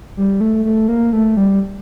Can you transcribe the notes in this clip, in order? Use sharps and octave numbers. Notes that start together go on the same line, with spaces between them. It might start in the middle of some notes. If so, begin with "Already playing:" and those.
G3
A3
A3
A#3
A3
G3